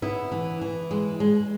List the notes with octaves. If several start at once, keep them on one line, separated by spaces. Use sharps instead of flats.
B3 E4
E3
E3
G#3
G#3